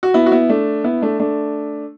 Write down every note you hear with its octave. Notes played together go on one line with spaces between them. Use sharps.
F#4
B3 E4
F#4
B3 E4
A3 D4
B3 E4
A3 D4
A3 D4